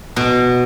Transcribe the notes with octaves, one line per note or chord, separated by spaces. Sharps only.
B2